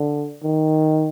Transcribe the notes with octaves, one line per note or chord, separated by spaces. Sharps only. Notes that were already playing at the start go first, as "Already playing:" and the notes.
Already playing: D3
D#3